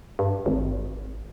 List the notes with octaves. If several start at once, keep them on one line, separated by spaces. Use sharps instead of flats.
G2
G#1